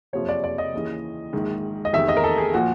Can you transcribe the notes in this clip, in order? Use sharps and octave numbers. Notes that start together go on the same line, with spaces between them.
F#1 F2 C3 F3 C#5
D5
D5
D#5
D#2 C#3 E3
A#1 G#2 D#3
D#5
F1 E2 C3 D#3 E5
D#5
A#4
A4
G#4
A#2 F3 F#4